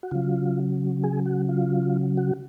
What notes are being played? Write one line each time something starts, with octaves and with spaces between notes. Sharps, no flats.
F#4
C#3 F#3 F4
G#4
F#4
F4
F#4